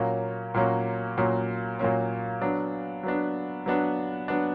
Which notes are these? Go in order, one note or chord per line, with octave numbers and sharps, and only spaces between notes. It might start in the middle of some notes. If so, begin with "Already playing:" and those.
Already playing: A#2 F#3 A#3 C#4
A#2 F#3 A#3 C#4
A#2 F#3 A#3 C#4
A#2 F#3 A#3 C#4
F#3 B3 D4
F#3 B3 D4
F#3 B3 D4
F#3 B3 D4